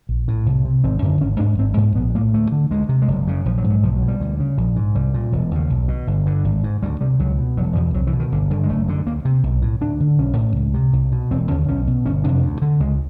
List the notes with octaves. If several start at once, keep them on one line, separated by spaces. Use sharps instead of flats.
A#1
A2
C2
C3
G#1 C4
F#2 D3
G#1 C#4
G#2 D4
G#1 C4
G#2 B3
A#1 B3
A2 A#3
D2 A3
D3
D2 G#3
C3
G#3
F#1 G3
F#2 C#3
A#1 F3
F#3
G#2
F#3
B1 F3
F#3
B2
G3
D2
C#3
A#1
G#2
C2 G3
A#2
E1
D#2 C#3
B1
B2
G1
G2 D3
G#1
G#2
D2 G3
C3 G3
C#2 F#3
B2
E1 F#3
E2 B2 F3
C2 F#3
E3
B2
D#3
G1 D3
G2 D3 D#3
G#3
F#1 A3
F#2 D3
D2 A#3
C3
B1
A2
D2 D4
D3
B1 C#4
A2
C#2
C3
C2
B2
E1 C4
D#2 D3 C#4
B1 C#4
B2
G1 C#4
F2 C3 D4
D2
D3
C#2 G#3